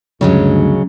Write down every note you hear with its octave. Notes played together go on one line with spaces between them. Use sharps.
D2 G2 C#3 F#3 G#3